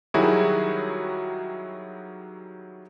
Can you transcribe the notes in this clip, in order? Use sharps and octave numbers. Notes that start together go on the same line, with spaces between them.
D#3 F#3 G3 E4 F#4 G#4